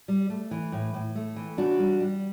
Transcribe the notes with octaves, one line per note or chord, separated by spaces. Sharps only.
G3
A3
E3
A2
A2
A3
E3
C#3 D4 F#4
G3
G3